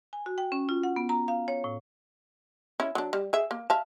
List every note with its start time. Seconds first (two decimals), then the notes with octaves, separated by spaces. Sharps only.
0.13 G#5
0.26 F#4
0.38 G5
0.52 C#4
0.69 F4
0.83 F#5
0.96 B3
1.09 A#5
1.28 F5
1.48 C#5
1.64 A2
2.80 C#4 E4
2.95 F#3 D4
3.13 G3
3.33 G#4 E5
3.51 A#3
3.70 E5 F5 A5